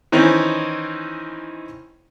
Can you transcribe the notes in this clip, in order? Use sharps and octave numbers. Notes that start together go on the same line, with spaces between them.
D#3 E3 C4 C#4 D#4